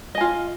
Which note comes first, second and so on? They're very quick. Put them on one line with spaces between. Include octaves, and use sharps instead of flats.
D#5 G#5 F4